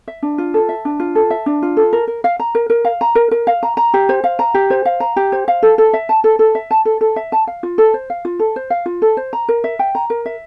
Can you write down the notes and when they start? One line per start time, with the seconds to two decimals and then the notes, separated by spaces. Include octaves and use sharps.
0.08 E5
0.23 D4
0.38 F4
0.54 A4
0.69 E5
0.85 D4
1.00 F4
1.15 A4
1.30 E5
1.46 D4
1.62 F4
1.77 A4
1.93 A#4
2.07 A#4
2.24 F5
2.39 A#5
2.55 A#4
2.70 A#4
2.85 F5
3.01 A#5
3.15 A#4
3.31 A#4
3.47 F5
3.63 A#5
3.77 A#5
3.94 G4
4.09 C5
4.24 F5
4.39 A#5
4.54 G4
4.70 C5
4.85 F5
5.00 A#5
5.16 G4
5.32 C5
5.48 F5
5.63 A4
5.78 A4
5.93 E5
6.09 A5
6.24 A4
6.39 A4
6.55 E5
6.71 A5
6.85 A4
7.01 A4
7.16 E5
7.32 A5
7.47 F5
7.63 F4
7.78 A4
7.94 C5
8.10 F5
8.25 F4
8.39 A4
8.56 C5
8.70 F5
8.86 F4
9.02 A4
9.17 C5
9.33 A#5
9.49 A#4
9.64 E5
9.79 G5
9.95 A#5
10.10 A#4
10.26 E5